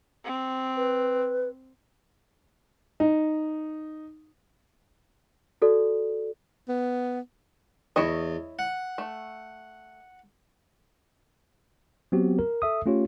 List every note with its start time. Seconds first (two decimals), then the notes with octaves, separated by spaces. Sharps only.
0.25 C4
0.77 B4
3.00 D#4
5.62 F#4 A4 D5
6.68 B3
7.96 E2 E4 C#5 D#5
8.59 F#5
8.98 A3
12.12 F#3 B3 C4 F#4 G4
12.39 A#4
12.62 A4 E5 D#6
12.86 A3 C#4 F4 G4 C#5